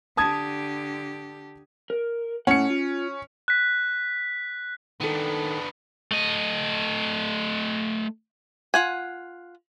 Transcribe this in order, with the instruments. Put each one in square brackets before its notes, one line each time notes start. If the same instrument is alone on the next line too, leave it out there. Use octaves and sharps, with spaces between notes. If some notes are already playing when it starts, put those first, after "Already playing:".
[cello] D3 G4 [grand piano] A5 D#6 G#6
[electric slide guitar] A#4
[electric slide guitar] A2 F#5 [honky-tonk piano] C#4 C#7
[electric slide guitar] F4
[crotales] F#6 B6
[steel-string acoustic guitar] D#3 A4 [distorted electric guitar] B3 D4
[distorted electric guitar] A3 D#5
[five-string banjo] F4 F#5 G#5